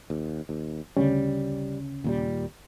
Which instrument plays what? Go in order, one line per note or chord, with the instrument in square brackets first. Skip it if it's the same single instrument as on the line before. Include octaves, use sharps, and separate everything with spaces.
[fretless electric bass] D#2
D#2
[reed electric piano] D2 C#3 C#4 [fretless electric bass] G3
[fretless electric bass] D#2 A#2 G3